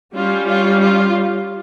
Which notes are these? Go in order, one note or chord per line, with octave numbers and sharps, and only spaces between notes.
G3 C#4 F4
F4
F4